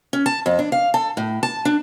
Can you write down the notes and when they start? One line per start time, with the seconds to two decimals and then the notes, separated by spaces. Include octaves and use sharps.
0.13 C#4
0.26 A5
0.46 F2
0.59 D4
0.72 F5
0.94 A4
1.17 A2
1.43 A5
1.65 D4